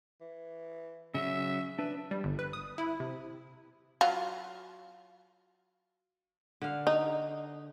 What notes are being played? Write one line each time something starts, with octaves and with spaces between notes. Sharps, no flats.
E3
C#3 F#3 E5 E6
D4 B4 E5
G3
G1
B4
D#6
E4
C3
F#3 F4
D3 F5
D#4